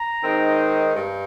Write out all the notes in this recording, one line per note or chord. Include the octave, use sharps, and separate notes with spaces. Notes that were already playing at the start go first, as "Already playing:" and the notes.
Already playing: A#5
D#3 G#3 C4 D#4
G2